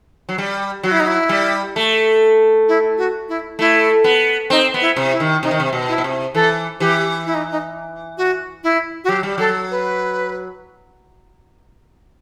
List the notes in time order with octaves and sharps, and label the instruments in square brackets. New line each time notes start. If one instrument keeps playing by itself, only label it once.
[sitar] F#3
G3
[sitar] F#3 [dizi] F#4
[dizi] E4
D#4
E4
[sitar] G3
A3
[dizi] E4
F#4
E4
[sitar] A3 [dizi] E4
[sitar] B3
[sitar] C4 [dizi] D#4
[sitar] B3
[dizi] E4
[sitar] C3
[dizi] E4
[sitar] D#3
[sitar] C3 [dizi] D#4
[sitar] D#3
C3
B2
[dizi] E4
[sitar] B2
C3
[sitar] E3 [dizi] A4
[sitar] E3 [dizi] G4
[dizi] E4
D#4
D#4
F#4
E4
F#4
[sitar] F#3 [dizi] G4
[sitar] G3
[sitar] F#3 [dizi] A4
[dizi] B4